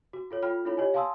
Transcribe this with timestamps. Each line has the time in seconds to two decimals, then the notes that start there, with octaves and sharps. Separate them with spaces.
0.13 F#4
0.31 F4 A4 C#5
0.43 F4 A4 G5 B5 F6
0.65 D4 E4 F4 A4 C#5 B5
0.77 G4 C#5 D#5 G#5
0.94 F5 G#5 A5 C6 D#6 E6